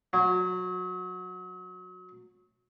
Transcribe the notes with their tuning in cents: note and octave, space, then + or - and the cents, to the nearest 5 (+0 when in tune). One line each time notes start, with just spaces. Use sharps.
F#3 -20